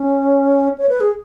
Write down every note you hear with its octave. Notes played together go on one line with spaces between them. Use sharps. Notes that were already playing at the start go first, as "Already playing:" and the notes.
Already playing: C#4
C#5
B4
G#4